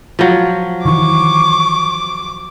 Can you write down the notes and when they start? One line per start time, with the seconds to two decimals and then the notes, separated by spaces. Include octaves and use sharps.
0.19 F3 F#3
0.86 D#3 E3 C#6 D6